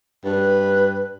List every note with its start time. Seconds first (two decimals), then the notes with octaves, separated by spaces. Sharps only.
0.24 G2 B4